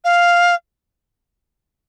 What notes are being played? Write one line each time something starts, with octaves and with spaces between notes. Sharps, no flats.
F5